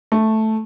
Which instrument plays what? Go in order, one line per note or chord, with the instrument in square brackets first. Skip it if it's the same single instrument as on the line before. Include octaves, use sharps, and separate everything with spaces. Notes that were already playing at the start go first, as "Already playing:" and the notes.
[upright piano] A3